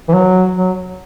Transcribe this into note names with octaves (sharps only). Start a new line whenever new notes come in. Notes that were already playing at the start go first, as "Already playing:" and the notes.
E3
F#3
F#3